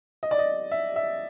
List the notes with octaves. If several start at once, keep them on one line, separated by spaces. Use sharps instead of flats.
D#5
D5
D#5
E5
E5